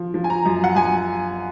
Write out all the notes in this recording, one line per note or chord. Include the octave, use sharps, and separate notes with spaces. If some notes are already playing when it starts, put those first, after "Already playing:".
Already playing: F3
F3
G#5
A#5
F#2
F#5
F#2 G#5